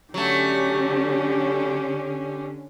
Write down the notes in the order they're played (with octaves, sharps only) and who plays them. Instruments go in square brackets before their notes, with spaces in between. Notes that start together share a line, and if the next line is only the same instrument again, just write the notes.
[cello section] D3 C#4 [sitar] F#3 A3 [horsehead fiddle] G4